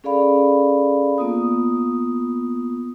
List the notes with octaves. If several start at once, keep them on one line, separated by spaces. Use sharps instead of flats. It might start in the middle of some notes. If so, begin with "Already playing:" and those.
C#4 G#4 A4 D5 F5 B5
A#3 B3 F4 D#6